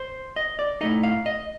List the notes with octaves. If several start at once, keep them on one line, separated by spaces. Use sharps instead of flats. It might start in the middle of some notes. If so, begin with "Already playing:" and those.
Already playing: C5
D#5
D5
A2 A3 D#4 D#5
F5
D#5